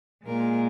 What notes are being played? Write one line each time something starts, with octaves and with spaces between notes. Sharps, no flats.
A#2 G#3 A#4